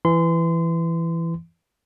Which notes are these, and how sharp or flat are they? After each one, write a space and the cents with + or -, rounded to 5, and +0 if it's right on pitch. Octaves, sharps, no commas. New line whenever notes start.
E3 +15 C6 -30